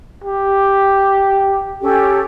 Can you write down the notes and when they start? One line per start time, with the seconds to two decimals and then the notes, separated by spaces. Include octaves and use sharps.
0.24 G4
1.81 C#4 G4 A4